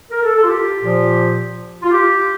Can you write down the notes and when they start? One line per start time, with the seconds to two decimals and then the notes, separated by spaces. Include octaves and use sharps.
0.11 A#4
0.23 A4
0.35 A4
0.43 F4
0.46 G4
0.82 A#2 F3
1.82 F4
1.90 G4